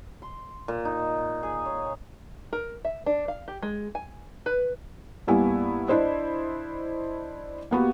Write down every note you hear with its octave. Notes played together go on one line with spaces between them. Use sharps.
C6
A#2
D#4
G#4
C#5
A#4
E5
D4
F5
G4
G#3
G#5
B4
G2 G3 A#3 B3 E4 G#5
D4 E4 C5 D#5
A#3 B3 F#4 G4